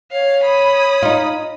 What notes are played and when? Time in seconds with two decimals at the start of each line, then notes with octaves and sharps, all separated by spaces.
0.12 C#5 F5
0.43 B5 D#6
1.03 D#4 F4